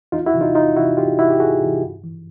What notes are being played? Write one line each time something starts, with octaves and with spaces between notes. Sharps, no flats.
E2 D#4 F4
E4 F#4
C3 E3
D#4 F4
E2 D#4 F4
C3 E3 E4 F#4
E2 F4 G4
C3 E3 E4 F#4
G4
E2 F#4 G#4
C3 E3
G2
E3